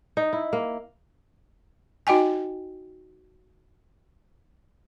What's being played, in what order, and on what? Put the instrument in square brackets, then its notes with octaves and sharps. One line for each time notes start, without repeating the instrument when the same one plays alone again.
[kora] D#4
E4
A#3
[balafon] D#4 F#4 D#5 G5 G#5